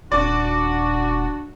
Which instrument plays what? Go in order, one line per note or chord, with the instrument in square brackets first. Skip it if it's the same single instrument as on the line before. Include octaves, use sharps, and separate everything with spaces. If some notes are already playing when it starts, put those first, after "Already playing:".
[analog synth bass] D#1 [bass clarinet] D4 [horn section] F#4 [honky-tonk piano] D5